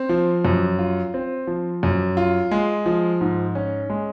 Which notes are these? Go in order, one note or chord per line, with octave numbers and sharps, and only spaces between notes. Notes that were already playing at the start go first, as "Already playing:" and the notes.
Already playing: C4
F3
F#2
F4
C4
F3
F#2
F4
G#3
F3
G#2
C#4
G#3